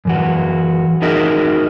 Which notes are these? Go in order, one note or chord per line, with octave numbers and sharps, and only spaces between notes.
F#2 E3 F#4
D#4 F#4 G#4 A#4 D#5 E5